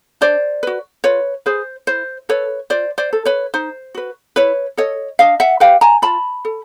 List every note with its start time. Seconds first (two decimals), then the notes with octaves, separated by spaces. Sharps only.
0.21 D4 C5 D5
0.63 F#4 B4
1.04 F4 B4 C#5
1.46 G#4 B4 C5
1.87 E4 C5
2.29 A4 B4 C#5
2.70 F4 C5 D5
2.98 C5 D5
3.13 A4
3.25 B4 C#5
3.54 D#4 C5
3.94 F#4 B4
4.36 E4 B4 C#5
4.77 A4 C#5 D#5
5.19 D4 D#5 F5
5.40 E5 F#5
5.60 G4 B4 F5 G5
5.81 G#5 A#5
6.02 F4 A5 B5
6.45 A4